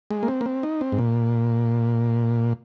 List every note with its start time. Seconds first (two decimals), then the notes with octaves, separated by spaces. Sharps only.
0.11 G#3
0.23 A#3
0.28 C4
0.41 A#3
0.46 C4
0.63 D#4
0.81 C4
0.92 G#2
0.99 A#2